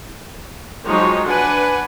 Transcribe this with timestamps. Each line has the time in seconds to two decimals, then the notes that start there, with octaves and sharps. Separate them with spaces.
0.87 F3 F#3 G#3 D#4 G4 C#5
1.27 D4 B4 F#5 G#5